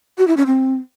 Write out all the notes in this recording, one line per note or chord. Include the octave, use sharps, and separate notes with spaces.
F#4
E4
C#4
C4